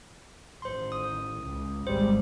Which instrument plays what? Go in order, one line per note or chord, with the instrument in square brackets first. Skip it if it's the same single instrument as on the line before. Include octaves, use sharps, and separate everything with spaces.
[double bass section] A1 D#3 [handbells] C5 C6
[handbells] D#6
[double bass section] C#2
[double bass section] G#1 G3 G#3 [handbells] C5